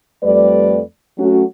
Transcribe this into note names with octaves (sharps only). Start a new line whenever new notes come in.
F2 G3 A3 B4 D5
F#3 A3 C#4 F#4